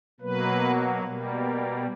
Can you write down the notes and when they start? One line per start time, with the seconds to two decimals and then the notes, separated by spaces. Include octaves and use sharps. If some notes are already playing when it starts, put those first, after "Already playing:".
0.20 B2 F#3 A#3 B4
1.03 B2 G3 A#3